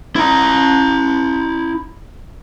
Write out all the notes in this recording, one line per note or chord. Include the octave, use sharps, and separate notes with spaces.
E4 A#5